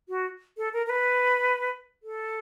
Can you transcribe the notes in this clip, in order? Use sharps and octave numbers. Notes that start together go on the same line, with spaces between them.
F#4
A4
A#4
A#4
B4
A4